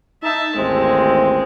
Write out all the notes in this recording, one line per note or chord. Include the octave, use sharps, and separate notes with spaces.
D#4 E5 A5
A1 D#2 G#3 C4